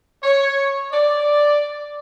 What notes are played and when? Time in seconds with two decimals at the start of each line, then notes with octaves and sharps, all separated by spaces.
0.23 C#5
0.92 D5